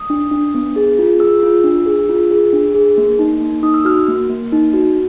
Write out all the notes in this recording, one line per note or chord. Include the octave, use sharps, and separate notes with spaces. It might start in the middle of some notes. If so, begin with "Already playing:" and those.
Already playing: D#6
D4
D4
B3
G#4
F4
G#4 E6
F4
D4
G#4
F4
G#4
D4
G#4
A#3
D#4
A#3
D#4 D#6
E6
F#4 F6
A#3
A#3
D#4
F#4